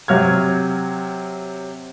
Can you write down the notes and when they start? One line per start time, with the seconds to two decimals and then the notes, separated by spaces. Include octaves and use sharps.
0.08 C3 F#3 F6 G#6